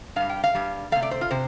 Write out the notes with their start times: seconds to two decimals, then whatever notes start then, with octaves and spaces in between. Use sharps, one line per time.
0.16 G2 G3 F5
0.29 G5
0.44 F5
0.55 G2 G3
0.92 C3 A3 F5
1.03 D5
1.11 C5
1.21 F4
1.31 C3 C5